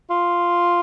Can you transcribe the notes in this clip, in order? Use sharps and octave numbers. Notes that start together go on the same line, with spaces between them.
F4